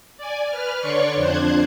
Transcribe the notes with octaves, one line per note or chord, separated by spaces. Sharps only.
D5 G#5
B4 F6
D3 C#5 D5 C6 C#6 C#7
F2 D4 C5 F#6 G#6